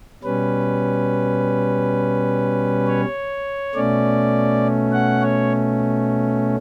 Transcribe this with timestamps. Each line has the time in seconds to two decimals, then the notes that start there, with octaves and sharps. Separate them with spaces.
0.23 B2 G3 C#4 B4
2.87 C#5
3.75 B2 A3 C#4 D5
4.92 F#5
5.22 C#5